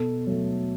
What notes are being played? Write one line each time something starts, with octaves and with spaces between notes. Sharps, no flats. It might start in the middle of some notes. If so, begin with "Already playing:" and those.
Already playing: B2 A4
F#3 A3